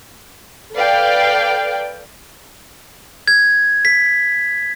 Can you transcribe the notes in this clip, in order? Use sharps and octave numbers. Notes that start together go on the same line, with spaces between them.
A4 B4 D5 F5 G5
G#6
B6